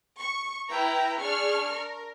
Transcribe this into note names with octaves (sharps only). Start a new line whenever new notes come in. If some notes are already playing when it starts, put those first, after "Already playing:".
C#6
E4 B4 G5 A#5
D4 G#4 C#6 F6
A#4